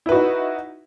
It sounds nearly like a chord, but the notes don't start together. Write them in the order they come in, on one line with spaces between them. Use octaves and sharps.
E4 B4 F#4 D#4